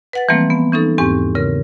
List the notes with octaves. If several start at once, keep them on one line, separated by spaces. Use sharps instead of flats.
B4 F#5 A6
E3 F3 G3 A3 A#3 C4
B3
E3 C#4 D#4 A4
E2 G#2 C4 G4 C#6
C#3 A#4